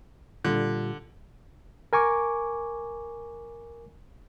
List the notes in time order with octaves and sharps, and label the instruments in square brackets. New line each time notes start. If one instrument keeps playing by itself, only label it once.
[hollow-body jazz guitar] A#2 G3 F4 [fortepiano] D3
[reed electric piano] A#4 G#5 C#6 D6